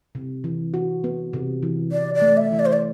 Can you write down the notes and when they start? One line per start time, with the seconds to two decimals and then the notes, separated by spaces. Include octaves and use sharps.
0.15 C3
0.44 E3
0.74 F#4
1.04 B3
1.33 C3
1.63 E3
1.92 E3 D5
2.15 D5
2.22 A3
2.37 E5
2.52 E3
2.59 D5
2.66 C5
2.73 D5